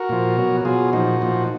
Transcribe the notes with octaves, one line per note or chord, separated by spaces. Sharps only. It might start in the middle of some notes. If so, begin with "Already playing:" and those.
Already playing: F#4 A#4
A#2 F3
B2 F#3
B2 F#3 F4 G#4
A#2 F3 D#4 F#4
A#2 F3